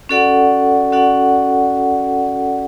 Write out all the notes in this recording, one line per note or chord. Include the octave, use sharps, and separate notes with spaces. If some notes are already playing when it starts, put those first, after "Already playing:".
C#4 F#4 A4 D5 F#5
C#4 F#4 A4 D5 F#5